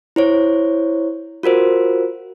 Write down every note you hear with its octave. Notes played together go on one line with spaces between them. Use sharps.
E4 C5 C#5
F4 F#4 A#4 C5